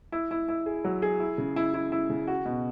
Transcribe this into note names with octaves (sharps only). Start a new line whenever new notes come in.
E4
E4
E4
G#4
F#3
G#4
E4
C#3
E4
E4
E4
C#3
F#4
B2